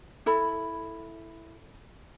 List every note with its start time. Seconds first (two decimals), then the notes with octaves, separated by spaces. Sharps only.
0.26 E4 A4 B5